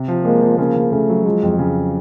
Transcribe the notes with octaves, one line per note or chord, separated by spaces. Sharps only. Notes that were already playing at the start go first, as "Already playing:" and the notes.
Already playing: C3
F3
G#3 A#3
F3
C#3 A#3
C#3
C#3 A3
F#3
F3 G#3
F2
C#3